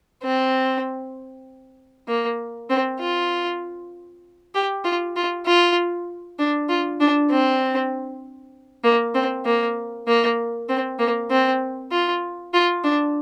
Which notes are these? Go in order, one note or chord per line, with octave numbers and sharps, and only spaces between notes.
C4
A#3
C4
F4
G4
F4
F4
F4
D4
F4
D4
C4
A#3
C4
A#3
A#3
C4
A#3
C4
F4
F4
D4